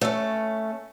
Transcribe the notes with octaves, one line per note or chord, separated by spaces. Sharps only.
A3 C#4